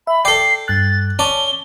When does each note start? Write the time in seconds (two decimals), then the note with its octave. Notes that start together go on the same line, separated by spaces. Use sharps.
0.07 E5 B5
0.25 A4 D5 G5 C7
0.68 G2 F#6 A6
1.19 C#4 D5 A5 G7